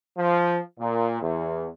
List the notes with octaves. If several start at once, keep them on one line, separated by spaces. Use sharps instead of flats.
F3
A#2
E2